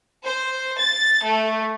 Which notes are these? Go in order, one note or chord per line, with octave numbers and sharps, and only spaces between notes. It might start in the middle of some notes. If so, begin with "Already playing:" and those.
C5
A6
A3